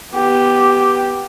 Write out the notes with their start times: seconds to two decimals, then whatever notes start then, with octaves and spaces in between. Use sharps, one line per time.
0.14 B3 G4